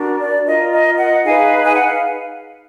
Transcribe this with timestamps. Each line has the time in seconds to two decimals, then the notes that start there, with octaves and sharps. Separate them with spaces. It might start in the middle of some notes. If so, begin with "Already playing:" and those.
Already playing: D4 F#4 A#4
0.20 D5
0.47 F4 A#4 D#5
0.72 D#5
0.98 D#5 F#5
1.24 D#4 G#4 B4 F5 G#5
1.63 G#5
1.75 F#5
1.87 F5